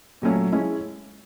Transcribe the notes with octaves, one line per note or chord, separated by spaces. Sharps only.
A#2 F#3 A3 C#4
G#3 C#4 E4